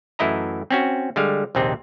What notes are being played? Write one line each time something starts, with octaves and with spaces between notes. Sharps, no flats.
F#2 E3 A3 E4 D#5 A#5
C4 C#4 F#4
D3 G3 G#3 F5
A#1 D#2 C3 C4 D#4